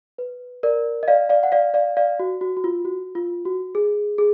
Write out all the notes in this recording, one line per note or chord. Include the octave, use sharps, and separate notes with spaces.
B4
A#4 D5
D#5
D5 F5
D5 F5
F#5
D5 F5
D5 F5
D5 F5
F#4
F#4
F#4
F4
F#4
F4
F#4
G#4
G#4